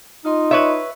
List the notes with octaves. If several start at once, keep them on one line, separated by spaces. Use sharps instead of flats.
D#4 F4 D#5 C6
B4 C#5 E5